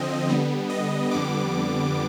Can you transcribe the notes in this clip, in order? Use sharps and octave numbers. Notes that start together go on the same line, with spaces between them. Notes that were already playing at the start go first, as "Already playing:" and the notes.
Already playing: D3 F3 C4 D#5
D3 G3 B3
D#5
F2 D3 G3 B3 D6